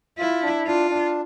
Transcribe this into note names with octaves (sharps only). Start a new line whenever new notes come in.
E4 F4
D4
D4 F4
D4